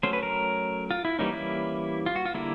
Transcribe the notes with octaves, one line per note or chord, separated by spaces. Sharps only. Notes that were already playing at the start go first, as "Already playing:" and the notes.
F#3 A3 C#4 C5
B4
A#4
F4
E4
E3 G3 A#3 C#4 D#4
E4
F4
F#4
F4
D3 G3 A#3 E4